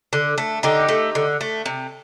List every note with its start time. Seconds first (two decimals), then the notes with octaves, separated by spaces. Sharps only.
0.13 D3
0.38 A3
0.63 D3 D#4 G4
0.89 A3
1.15 D3
1.41 A3
1.66 C3